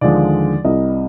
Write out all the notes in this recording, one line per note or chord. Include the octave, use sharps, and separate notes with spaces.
D#2 D3 F3 G#3 D5
C2 C3 G3 D#5